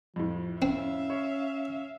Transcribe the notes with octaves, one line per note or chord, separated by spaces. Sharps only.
F2 A2 F3
C4 C#4 E5 F5
C#5